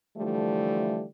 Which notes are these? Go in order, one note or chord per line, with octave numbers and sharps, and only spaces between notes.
D3 E3 F3 G3 A3